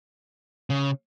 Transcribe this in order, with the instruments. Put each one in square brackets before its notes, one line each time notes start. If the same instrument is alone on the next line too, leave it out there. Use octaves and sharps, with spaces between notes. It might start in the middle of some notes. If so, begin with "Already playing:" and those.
[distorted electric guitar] C#3